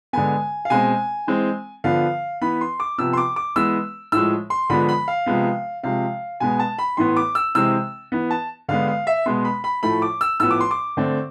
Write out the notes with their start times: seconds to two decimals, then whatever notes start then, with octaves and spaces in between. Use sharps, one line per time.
0.13 D3 G#3 B3 G#5
0.65 F5
0.70 B2 G#3 C4 G#5
1.27 E3 G#3 C4
1.84 D3 F3 B3 F5
2.41 E3 B3 B5
2.61 C6
2.80 D6
2.98 C3 F3 B3 E6
3.13 C6
3.17 D6
3.36 D6
3.56 E3 G#3 B3 E6
4.12 A2 F3 G#3 E6
4.50 C6
4.70 D3 F3 G#3 B3 B5
4.89 B5
5.08 F5
5.26 C3 F3 G#3 B3
5.83 C3 F3 G#3 F5
6.40 B2 G#3 B3 G#5
6.59 A5
6.78 B5
6.97 A2 E3 B3 C6
7.17 D6
7.35 E6
7.55 C3 E3 G#3 C4 E6
8.12 E3 B3
8.31 A5
8.69 D3 G#3 B3 F5
8.88 F5
9.07 E5
9.26 B2 G#3 B3 C6
9.45 B5
9.64 B5
9.83 A2 F3 A3 B5
10.02 D6
10.21 E6
10.40 A2 F3 B3 E6
10.51 D6
10.61 C6
10.71 D6
10.97 D3 A3 C4